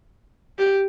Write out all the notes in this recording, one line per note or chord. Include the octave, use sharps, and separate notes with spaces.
G4